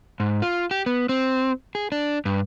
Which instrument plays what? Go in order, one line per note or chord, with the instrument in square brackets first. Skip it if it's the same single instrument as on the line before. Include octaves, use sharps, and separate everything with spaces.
[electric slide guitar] G#2
F4
G4
B3
C4
G#4
D4
G2